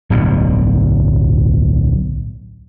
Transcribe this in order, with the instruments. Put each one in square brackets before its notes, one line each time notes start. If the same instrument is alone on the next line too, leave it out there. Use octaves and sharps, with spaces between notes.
[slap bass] D1 B1 G2 B2